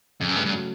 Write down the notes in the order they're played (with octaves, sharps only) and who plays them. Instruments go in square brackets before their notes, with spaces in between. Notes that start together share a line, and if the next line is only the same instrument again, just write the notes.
[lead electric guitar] F2 [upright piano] C#3
[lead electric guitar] F#2
[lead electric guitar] G2 [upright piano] A3
[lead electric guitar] G2
[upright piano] F#3